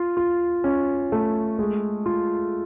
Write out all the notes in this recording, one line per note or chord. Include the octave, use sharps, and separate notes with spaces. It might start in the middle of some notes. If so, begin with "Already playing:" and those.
Already playing: F4
F4
C#4
A3
G#3
F4